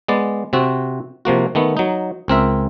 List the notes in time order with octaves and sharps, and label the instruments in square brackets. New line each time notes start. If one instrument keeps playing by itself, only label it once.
[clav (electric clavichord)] G#3 B3 D5
C3 C4 F#4
C3 F3 A#3 F#4
D#3 A3 B3
F#3 D#4
C#2 C4 A#4 E5